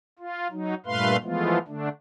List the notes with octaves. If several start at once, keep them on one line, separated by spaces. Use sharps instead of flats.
F4
F#3 D#4
G2 A#2 A3 B4 F5 C6
E3 F3 G#3 A3 B3 F4
D3 A3 D4